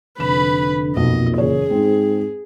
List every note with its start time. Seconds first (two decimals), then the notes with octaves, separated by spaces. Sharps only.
0.20 F1 D3 B4 B5 E7
0.96 B1 F2 A#2 D#5
1.38 F#1 E3 G#4 C#5
1.70 G#2 C4